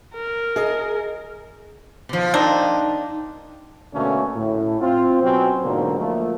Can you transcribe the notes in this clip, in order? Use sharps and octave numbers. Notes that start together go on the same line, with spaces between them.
A#4
G#4 D#5
B2 F3
A#3 C4 D4 D#4
B2 D3 A3 A#3 C#4
A2
C4 F4
B2 F#3 C4 C#4
G#2 B2 D3 F3 F#3 A#3
F3 A3 A#3